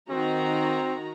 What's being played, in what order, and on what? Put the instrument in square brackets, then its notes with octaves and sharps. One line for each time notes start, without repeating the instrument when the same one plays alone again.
[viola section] D#3 F#4 A#5 [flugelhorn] C4